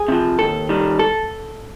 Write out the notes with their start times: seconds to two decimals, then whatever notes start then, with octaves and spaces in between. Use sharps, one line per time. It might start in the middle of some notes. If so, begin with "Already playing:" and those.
Already playing: G#4
0.08 C3 F3
0.39 D#2 A4
0.69 D#3 G3
0.99 A4